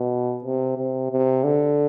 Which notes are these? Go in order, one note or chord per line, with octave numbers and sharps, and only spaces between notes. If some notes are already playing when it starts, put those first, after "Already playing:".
Already playing: B2
C3
C3
C3
D3